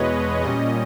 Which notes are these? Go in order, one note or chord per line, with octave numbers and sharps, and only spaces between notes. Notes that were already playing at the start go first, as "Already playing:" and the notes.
Already playing: E2 B2 G#3 B4 C#5 D#5
A#2 G3 C#4 D#5